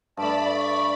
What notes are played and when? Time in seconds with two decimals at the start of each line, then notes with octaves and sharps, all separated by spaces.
0.17 G2 A3 D5 A5 B5
0.56 C#6